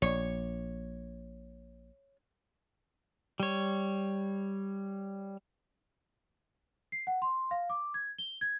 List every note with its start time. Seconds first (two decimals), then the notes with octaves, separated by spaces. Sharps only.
0.02 A#1 C#5
3.40 G3 C#5
6.92 C7
7.07 F#5
7.22 C6
7.51 F5
7.70 D6
7.94 G#6
8.18 G7
8.41 G#6